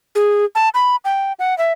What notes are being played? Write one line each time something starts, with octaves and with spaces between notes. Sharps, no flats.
G#4
A5
B5
G5
F#5
E5